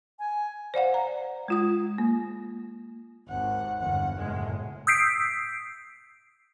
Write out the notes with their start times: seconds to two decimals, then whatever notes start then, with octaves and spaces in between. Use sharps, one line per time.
0.19 G#5
0.74 C5 D5 F5 F#5
0.94 A#5
1.48 G#3 F4 D#6
1.98 A#3
3.28 G#1 D#2 F#5
3.81 G1 E2 F#5
4.18 F#1 A2 G#3
4.87 D#6 E6 G6 B6 C7 D7